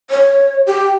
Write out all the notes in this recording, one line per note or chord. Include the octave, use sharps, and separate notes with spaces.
C#5
G4